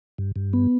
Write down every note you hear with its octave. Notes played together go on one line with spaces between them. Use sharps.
G2
G2
B3